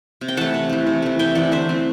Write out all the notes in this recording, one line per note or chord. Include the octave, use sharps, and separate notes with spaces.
C3
G5
E3 A3 F#5 A5
C3
E3 A3
C3
E3 A3
C3 E5 G5
E3 A3 D5 F#5
D3 C5 E5
A3 C4